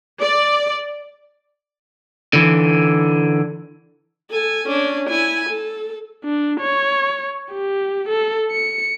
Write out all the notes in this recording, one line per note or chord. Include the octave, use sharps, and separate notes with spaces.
D5
D3 E3
A4 G#5
C#4 D4
E4 G#5
A4
D4
C#5
G4
A4
C#7